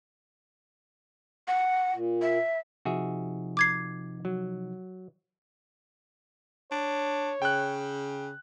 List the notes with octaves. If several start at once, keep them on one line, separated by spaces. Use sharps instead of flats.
F#5
A#2
E5
C3 F3 D#4 F#4 G#4 E5
D6 G#6 C7
F#3
D4 C#5
C#3 G5 F#6